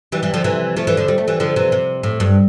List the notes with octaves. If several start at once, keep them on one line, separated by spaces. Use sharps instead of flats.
E3 G3
E3 G3
D3 F3
C3 E3
F3 A3
E3 G3
D3 F3
G3
A3
E3 G3
D3 F3
C3 E3
C3
A2
G2